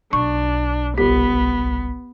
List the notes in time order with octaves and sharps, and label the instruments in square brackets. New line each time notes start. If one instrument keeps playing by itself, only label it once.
[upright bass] B1 [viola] D4 [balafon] C#6
[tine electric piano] G1 C2 B6 [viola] B3 [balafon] G4